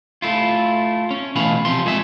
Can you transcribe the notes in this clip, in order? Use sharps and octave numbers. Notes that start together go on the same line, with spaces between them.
A3 E4 F4
C#4
B2 E3 A3 F5 B5
C3 F3 C6
F2 G#3 G#4 E5